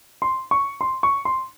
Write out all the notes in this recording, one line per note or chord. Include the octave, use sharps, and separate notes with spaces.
C6
C#6
C6
C#6
C6